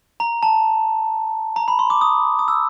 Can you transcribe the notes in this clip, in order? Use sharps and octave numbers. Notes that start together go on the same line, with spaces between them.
A#5
A5
A#5
B5
C6
D6
D#6
D#6
E6